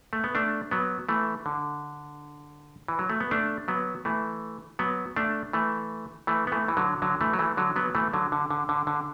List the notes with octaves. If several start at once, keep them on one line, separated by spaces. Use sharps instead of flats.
A3
B3
A3 D4
F#3 B3
E3 A3
D3
E3
F#3
A3
B3
A3 D4
F#3 B3
E3 A3
F#3 B3
A3 D4
E3 A3
E3 A3
B3
E3 A3
E3
D3 F#3
D3 F#3
E3 A3
F#3
E3 A3
D3 F#3
F#3 B3
E3 A3
D3 F#3
D3
D3
D3
D3